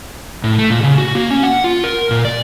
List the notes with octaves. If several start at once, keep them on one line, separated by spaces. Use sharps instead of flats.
A2
A3
A#2
C#3
F#4
A#3
C#4
F#5
F4
A#4
A#2
D5